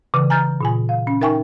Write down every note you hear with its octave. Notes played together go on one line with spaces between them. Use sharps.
C#3 E3
G#5 A#5 F6 G6 A6
A#2 F4 G#5
F5
C#4
D#4 A#4 E5 G5 G#5 C#6